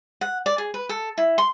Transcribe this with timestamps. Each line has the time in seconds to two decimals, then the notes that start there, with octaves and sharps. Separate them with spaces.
0.21 F#5
0.46 D5
0.58 G#4
0.74 B4
0.89 A4
1.18 E4
1.38 C6